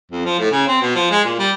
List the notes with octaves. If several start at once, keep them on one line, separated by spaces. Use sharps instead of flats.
F2
F3
A2
C#3
C4
B2
F3
G#3
A#2
G3